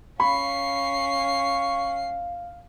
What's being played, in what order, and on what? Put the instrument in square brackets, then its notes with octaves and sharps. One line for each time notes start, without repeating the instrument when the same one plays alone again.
[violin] C#4 C7 [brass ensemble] F5 [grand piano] B5 [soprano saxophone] C#6